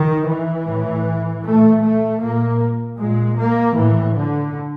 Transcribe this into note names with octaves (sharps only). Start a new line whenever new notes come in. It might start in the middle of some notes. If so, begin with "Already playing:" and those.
Already playing: D#3
E3
A2
A#2 A3
A3
A#2 A#3
A#2 G#3
A#3
A2 E3
D3